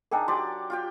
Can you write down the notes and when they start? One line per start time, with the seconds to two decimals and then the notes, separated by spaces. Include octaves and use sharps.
0.11 D4 D#4 G#4 A#4 G5 G#5
0.28 F#3 G4 D5 C6
0.70 F4 G4 G5